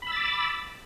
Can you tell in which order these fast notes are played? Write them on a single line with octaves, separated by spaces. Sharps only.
B5 E6 A6 D6